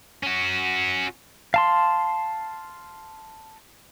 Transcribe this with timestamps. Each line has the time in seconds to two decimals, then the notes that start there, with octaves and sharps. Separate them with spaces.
0.23 C#4 F#4
1.54 F5 A5 C6